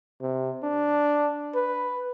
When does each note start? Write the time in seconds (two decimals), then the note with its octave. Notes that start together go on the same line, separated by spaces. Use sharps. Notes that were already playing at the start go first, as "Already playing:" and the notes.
0.21 C3
0.63 D4
1.55 B4